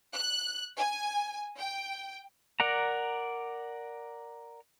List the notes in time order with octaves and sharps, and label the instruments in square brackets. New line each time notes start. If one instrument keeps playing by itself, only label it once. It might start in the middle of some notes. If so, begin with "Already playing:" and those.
[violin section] F#6
G#5
G5
[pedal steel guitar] A#4 D5 F#5 A#5